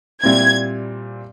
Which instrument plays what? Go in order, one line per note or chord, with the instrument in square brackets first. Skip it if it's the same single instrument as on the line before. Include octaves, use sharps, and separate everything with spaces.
[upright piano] A#2 G3 C4 E4 [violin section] G#6